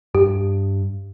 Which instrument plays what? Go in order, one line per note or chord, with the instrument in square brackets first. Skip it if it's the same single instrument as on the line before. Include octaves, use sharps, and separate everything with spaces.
[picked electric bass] G2 [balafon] G4